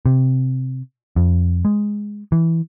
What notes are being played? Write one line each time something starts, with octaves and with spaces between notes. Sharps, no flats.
C3
F2
G#3
E3